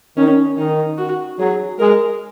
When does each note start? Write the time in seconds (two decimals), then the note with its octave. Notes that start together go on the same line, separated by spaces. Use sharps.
0.17 D#3 C#4
0.58 D#3 D#4
0.98 F#4
1.39 F#3 G#4
1.79 G#3 A#4